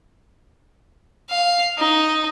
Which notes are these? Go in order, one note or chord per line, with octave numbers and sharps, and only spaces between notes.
F5
D#4